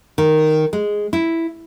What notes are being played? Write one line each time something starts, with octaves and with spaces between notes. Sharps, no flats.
D#3
G#3
E4